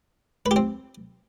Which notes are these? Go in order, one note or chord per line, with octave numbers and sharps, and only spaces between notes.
B4
G4
C4